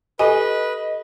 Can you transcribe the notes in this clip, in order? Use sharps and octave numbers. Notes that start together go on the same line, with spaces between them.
G4 A4 B4 C5 D#5 G#5